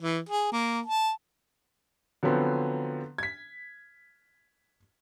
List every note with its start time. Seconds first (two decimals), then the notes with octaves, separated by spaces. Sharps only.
0.02 E3
0.29 G#4
0.52 A#3
0.86 A5
2.23 D3 F3 F#3 B3 C4
3.18 G#6 B6